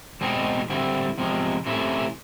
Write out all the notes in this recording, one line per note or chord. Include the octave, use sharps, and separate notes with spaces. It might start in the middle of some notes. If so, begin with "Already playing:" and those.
E2 B2 G#3 C4 D#4
D3 G3 C4 E4
E2 C3 F3 G#3
C3 E3 A3 C#4 E4